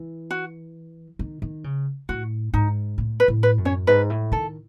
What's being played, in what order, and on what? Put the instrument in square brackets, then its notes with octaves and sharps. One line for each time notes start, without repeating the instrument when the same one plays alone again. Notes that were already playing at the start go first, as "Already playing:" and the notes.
Already playing: [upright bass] E3
[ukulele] F#4
[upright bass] D#3
D#3
C#3
[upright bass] A2 [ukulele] F#4
[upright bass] G#2 [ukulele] D#4
[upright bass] A2
[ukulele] B4
[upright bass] A2
[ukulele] B4
[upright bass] F#2
[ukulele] C#4 C#5
[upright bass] G#2 [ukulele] B4
[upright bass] A2
[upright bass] D#3 [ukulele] A4